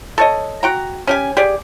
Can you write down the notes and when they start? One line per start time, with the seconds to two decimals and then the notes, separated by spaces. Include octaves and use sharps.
0.18 A4 C#5 D#5
0.63 F#4 G5 A#5
1.07 C#4 G4 G#5
1.37 G4 G#4 D5